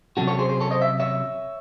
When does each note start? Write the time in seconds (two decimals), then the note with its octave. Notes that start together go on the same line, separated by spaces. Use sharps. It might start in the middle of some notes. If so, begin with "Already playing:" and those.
0.17 C3 F#3 C#4 F#4 A4
0.27 A4 C#5
0.39 G#4 C5
0.49 G#4 C5
0.60 A4 C#5
0.71 C5 D#5
0.82 E5
1.00 C#5 E5